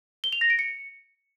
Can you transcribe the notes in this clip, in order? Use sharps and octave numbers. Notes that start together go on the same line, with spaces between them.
G7
F7
A#6
D7
C#7